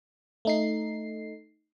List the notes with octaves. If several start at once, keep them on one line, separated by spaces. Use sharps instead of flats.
A3 D#4 C7